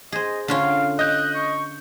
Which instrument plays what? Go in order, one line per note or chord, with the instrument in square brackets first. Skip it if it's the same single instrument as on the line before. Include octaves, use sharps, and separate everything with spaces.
[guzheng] G#4 C5 [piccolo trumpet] D#5
[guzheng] D3 C#4 F4 [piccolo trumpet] F5
[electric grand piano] D#5 G6 [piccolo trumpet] F#6
[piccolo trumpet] C#6